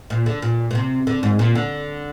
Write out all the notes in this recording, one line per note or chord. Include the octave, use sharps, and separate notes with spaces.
A#2
D3
A#2
A#2
C3
D3
G#2
A#2
D3